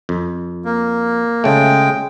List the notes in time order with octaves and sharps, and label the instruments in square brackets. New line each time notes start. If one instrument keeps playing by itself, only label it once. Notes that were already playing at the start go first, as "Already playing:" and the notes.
[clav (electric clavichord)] F2
[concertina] A#3
[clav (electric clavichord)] C#3 A3 [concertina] G#3 G5